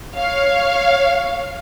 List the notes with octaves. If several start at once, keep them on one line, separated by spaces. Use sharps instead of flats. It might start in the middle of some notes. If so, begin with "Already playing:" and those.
C#5 F5